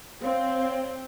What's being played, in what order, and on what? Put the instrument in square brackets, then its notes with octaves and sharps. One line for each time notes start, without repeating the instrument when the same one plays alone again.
[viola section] C4 [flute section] C#5 F5